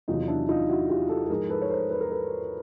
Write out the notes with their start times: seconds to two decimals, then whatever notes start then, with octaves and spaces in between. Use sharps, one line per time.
0.08 E2 C3 D#3 F#3 D#4 F4
0.28 D4 E4
0.49 D#4 F4
0.69 E4 F#4
0.89 F4 G4
1.09 G4 A4
1.25 A4
1.30 G#2 F3 G#4 A#4
1.50 A4 B4
1.62 C#5
1.70 A#4 C5
1.90 B4
2.01 A#4
2.11 A4 B4